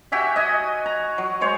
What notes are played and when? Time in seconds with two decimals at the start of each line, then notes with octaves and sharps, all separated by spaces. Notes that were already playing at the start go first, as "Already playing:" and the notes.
0.12 F#4 G4 E5 G#5
0.36 D#5 G#5
0.86 A#5
1.18 F#3
1.41 G#3 C5 C#5